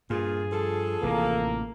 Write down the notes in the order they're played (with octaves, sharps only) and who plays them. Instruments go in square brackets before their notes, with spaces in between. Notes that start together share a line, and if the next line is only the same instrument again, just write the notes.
[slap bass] G2 [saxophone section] A#2 F4 [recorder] G#4
[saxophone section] F3 A4
[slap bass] A1 C3 E3 [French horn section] A#3